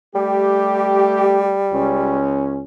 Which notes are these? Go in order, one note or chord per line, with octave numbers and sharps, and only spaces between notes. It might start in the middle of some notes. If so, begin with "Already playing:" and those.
G3 A3 G4
C#2 C#4